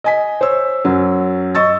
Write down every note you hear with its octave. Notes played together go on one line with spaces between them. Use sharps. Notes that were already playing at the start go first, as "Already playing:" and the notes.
D#5 G#5 B6
C5 C#5 E6
F#2 F#3 C#4
D#5 C#6 E6 A6